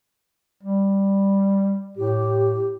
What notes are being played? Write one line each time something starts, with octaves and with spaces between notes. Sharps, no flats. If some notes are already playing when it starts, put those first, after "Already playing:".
G3
A2 G4